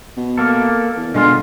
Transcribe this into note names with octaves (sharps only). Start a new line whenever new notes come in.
B2
A#3 A4
E2
B2 D3 G#3 F4